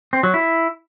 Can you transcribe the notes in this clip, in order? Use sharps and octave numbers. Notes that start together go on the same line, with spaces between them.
C4
F#3
E4